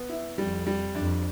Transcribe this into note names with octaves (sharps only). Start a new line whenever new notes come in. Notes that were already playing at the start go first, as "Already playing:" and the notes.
Already playing: B3
E4
F2 G3
G3
F2 D4